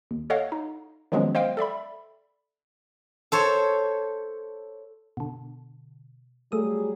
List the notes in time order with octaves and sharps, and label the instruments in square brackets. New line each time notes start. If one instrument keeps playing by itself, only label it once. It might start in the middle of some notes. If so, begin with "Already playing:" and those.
[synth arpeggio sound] D#2
A4 C#5 D#5 F5 F#5
D#4
D#3 F3 F#3 G#3 B3 C#4
C5 D#5 F5 G5
A4 D5 E5 B5
[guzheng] A4 C5 C#5
[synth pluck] B2 D3
[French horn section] F#3 G3 G#4 [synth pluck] A3 D#6